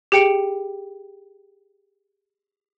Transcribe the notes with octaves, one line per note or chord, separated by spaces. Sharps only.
G4 G#4 G5 C#7 D7